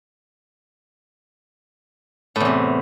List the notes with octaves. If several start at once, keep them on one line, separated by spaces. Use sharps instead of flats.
E2 A2 C3